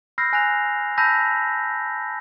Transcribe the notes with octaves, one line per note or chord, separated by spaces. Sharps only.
B5 E6 F6 G6 A#6 C7
G#5 F#6 A#6 C7 F7
A5 B5 E6 G6 A#6 B6